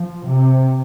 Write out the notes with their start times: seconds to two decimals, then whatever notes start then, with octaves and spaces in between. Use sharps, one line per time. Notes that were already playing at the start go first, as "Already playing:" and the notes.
Already playing: F3
0.25 C3